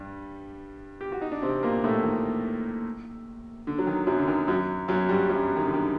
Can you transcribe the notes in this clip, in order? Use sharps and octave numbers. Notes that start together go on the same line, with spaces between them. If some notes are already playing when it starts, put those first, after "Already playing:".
Already playing: G2 G3
G4
F#4
D#4
D4
C3 C4
A#2 A#3
A2 A3
D#3
D3
F#3
D#3
F#2 F#3
D3
D#3
F#2 F#3
F#2 F#3
G2 G3
F#2 F#3
D#3
D3
D#3